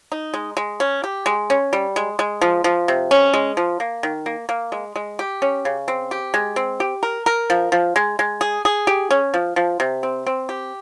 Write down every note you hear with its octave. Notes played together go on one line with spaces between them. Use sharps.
D#4
G#3
G#3
C#4
G4
G#3
C#4
G3
G#3
G#3
F3
F3
C3
C#4
G#3
F3
A#3
D#3
A#3
A#3
G#3
G#3
G4
C#4
C#3
C4
G4
G#3
C4
G4
A#4
A#4
F3
F3
G#3
G#3
G#4
G#4
G4
C#4
F3
F3
C3
C4
C4
G4